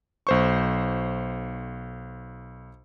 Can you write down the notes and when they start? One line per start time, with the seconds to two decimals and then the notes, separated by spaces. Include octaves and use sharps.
0.27 B1 C5 C#6